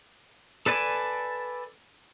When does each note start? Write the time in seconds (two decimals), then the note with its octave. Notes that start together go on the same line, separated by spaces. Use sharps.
0.66 A4 B4 D5 G#5 A5